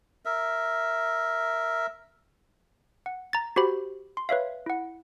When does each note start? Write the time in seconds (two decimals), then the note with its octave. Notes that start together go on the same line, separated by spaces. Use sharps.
0.25 A#4 E5
3.06 F#5
3.33 A#5 A6
3.56 F#4 G4 C5 B5
4.17 C6
4.29 B4 C#5 E5 F5
4.66 E4 F#5